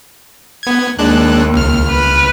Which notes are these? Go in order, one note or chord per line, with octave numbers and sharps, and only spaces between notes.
B3 G#6
D#2 G#3 D4 F#6
C#2 F6
B4